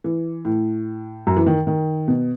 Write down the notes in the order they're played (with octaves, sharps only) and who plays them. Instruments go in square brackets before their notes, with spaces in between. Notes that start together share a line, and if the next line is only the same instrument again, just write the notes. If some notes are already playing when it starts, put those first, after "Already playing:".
[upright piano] E3
A2
F#2
E3
D#3
D#3
B2